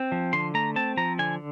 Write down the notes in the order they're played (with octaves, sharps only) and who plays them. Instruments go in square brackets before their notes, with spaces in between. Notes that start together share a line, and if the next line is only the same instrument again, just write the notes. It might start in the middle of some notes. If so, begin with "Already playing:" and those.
Already playing: [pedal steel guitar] C4
F3
D3 C6
A3 A#5
C4 A5
F3 A#5
D3 G#5